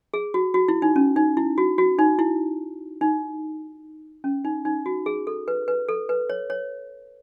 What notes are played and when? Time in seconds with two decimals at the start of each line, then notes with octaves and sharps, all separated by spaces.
0.14 G#4
0.34 F#4
0.54 F#4
0.68 E4
0.82 D#4
0.96 C#4
1.16 D#4
1.37 E4
1.58 F#4
1.78 F#4
1.99 D#4
2.19 E4
3.01 D#4
4.24 C#4
4.45 D#4
4.65 D#4
4.86 F#4
5.06 G#4
5.27 A4
5.48 B4
5.68 B4
5.89 A4
6.09 B4
6.30 C#5
6.50 C#5